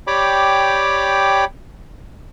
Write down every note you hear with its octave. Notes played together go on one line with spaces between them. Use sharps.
G4 C#5 D5 G5 B5 D6